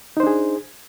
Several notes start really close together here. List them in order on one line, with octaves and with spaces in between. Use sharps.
D#4 C5 D4 G#4